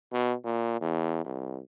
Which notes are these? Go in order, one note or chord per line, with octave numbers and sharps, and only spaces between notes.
B2
A#2
E2
C2